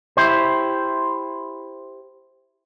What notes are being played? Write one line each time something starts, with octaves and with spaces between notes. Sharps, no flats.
E4 G4 C5